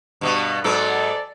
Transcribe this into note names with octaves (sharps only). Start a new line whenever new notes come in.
G2 B2 B3
G#2 F#3 B3 A4 D5